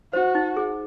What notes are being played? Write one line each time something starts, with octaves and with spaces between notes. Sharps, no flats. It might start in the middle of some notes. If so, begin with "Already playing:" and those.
F#4 C5
D#4
G#4